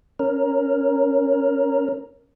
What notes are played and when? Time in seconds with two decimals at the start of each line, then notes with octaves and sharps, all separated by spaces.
0.19 C#4 A#4